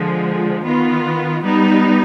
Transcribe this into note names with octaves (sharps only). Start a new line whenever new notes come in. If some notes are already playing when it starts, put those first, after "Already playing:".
Already playing: D3 F3 G#3
D#3 B3 F4
G3 B3 D#4